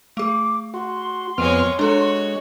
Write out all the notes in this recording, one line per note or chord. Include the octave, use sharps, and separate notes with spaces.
A3 G#4 D6
F#4 C6
F2 G#3 B3 C#5 F6
G#3 D4 F#4 A4 C#5